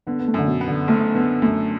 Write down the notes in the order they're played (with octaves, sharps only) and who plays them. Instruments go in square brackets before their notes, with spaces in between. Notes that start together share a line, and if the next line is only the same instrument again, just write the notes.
[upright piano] D3 [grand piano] B3
[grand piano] B3
A3
[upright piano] F#2 [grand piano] D3
[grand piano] B2
[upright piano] B3
[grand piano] D3
[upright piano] F#1 [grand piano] A3
[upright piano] D3 [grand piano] B3
[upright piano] F#2 [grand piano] A3